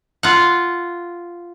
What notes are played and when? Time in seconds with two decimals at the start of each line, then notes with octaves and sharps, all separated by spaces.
0.23 F4 F#5